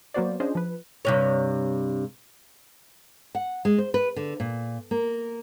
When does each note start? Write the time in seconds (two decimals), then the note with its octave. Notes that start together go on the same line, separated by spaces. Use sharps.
0.14 F#3 A#3 B3 F#4 C5 D5
0.40 C#4 D4 F4 G#4 C5 D#5
0.55 F3 B4
1.05 G2 C3 C#5
3.35 F#5
3.65 G#3
3.78 C5
3.94 B4
4.16 D3
4.40 A#2
4.91 A#3